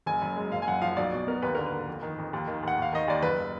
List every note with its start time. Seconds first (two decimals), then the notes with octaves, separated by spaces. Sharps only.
0.06 F#1 G#5
0.22 F#2
0.36 G#3
0.52 F#1 F5
0.62 G#5
0.67 F#2 F#5
0.82 F3 F5
0.97 B1 D5
1.12 B2
1.27 B3 A#4
1.42 D#2 B4
1.55 D3 A#4
1.66 B4
1.72 A#3
1.88 F2
2.02 D#3
2.18 F2
2.33 D#2
2.47 D#3
2.63 D#2 F#5
2.78 D#2 F5
2.93 D#3 D#5
3.08 D#2 D5
3.22 F#1 B4